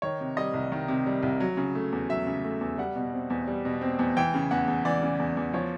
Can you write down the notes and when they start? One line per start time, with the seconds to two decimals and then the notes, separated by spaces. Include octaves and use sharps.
0.02 D#3 C#5
0.20 C3
0.37 G3 D#5
0.54 C2
0.72 D#3
0.88 C3
1.06 G3
1.23 C2
1.40 F#3
1.57 C#3
1.75 A3
1.92 E2
2.09 F#3 E5
2.27 C#3
2.44 A3
2.61 E2
2.78 G3 F#5
2.96 B2
3.13 C4
3.30 E2
3.48 G3
3.65 B2
3.81 C4
3.99 E2
4.17 E3 G5
4.34 C#3
4.51 E2 F#5
4.68 E2
4.85 E3 D5
5.02 C#3
5.19 E2
5.37 E2
5.53 F3 C#5